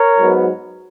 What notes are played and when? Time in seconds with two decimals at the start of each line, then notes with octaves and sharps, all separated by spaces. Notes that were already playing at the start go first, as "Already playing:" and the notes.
Already playing: A#4 C#5
0.18 G#2 F#3 B3